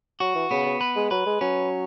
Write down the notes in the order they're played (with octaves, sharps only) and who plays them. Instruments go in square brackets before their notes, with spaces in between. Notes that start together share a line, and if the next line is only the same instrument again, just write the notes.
[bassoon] F#3 [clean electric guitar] F#4
[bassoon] E3
[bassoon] C#3 [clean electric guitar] B3
[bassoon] C#3
[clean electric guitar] B4
[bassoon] G#3
[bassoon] F#3 [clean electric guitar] B4
[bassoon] G#3
[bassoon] F#3 [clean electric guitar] C#4